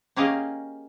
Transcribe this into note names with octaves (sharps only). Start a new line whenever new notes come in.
A#3 C#4 G4 G#4 D#5 F5